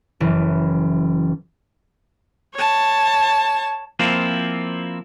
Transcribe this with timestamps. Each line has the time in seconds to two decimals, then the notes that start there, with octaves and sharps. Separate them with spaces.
0.20 F#1 E3
2.55 C#5 A5
3.99 F3 A#3 C4 E4 F4